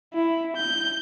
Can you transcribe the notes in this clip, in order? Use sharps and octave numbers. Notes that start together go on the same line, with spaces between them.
E4
G6